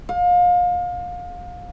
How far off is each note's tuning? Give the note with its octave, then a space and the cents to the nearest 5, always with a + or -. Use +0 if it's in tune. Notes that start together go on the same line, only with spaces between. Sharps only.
F5 +30